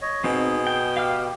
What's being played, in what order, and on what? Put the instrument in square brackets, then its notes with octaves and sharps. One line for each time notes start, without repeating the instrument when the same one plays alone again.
[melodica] C#5 D#5
[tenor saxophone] B2 [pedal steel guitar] C4 D#4 [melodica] G#4
[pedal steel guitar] G5
[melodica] G4 [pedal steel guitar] F5 G5 F6